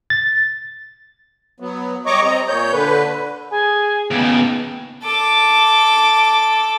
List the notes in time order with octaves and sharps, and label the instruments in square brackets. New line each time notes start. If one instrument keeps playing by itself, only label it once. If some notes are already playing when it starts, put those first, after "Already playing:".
[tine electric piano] A6
[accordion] F#3 B3
G3 C#5 D#5 A#5 C#6 D6
C4 D#5 A#5
A#2 C#5 G6
D3 B4
[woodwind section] G#4 [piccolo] G#5
[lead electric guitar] D#2 C#3 [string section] B3 [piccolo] D7
[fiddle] A4 D6